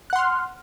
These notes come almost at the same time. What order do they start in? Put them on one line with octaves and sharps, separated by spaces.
F#6 F#5 C6 F6